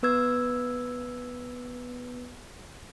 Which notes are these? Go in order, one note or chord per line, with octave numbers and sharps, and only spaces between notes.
B3 B4 E6 G#6